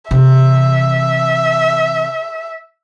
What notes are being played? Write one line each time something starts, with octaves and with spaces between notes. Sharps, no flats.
C3 E3 E5